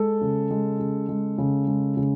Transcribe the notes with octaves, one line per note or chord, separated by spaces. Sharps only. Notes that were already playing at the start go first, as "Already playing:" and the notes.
Already playing: G#3 A4
C#3
G#3
C#3
G#3
C#3
G#3
C#3